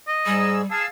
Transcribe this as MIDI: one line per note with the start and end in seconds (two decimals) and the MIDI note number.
0.08 0.57 75
0.26 0.62 44
0.26 0.66 55
0.26 0.62 68
0.26 0.62 88
0.71 0.85 68
0.71 0.88 77
0.71 0.88 81
0.71 0.88 88